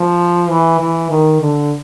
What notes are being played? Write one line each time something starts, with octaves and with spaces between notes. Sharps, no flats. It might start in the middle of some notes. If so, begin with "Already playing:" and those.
Already playing: F3
E3
E3
D#3
D3